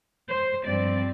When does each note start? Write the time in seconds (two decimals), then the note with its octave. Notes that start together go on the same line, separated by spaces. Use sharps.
0.29 C5
0.66 G2 F3 C4 D5